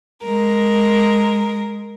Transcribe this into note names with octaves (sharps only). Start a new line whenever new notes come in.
G#3 A#4